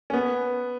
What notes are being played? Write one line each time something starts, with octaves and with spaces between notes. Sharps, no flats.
C#4
B3